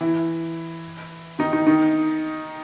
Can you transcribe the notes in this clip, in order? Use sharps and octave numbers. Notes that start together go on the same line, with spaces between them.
E3 E4
D#3 D#4
D#3 D#4
D#3 D#4